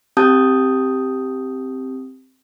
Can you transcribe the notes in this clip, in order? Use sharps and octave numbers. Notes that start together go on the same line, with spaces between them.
C4 G4 A5 D#6 G6